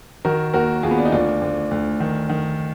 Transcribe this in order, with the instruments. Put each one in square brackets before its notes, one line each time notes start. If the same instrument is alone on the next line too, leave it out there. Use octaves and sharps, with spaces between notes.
[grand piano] D#3 F#4 A#4
D#2 F#4 A#4
D#2 F4 G#4
B3
D4
D#4
D2 D4 F4
D2
D2
D#3
D#3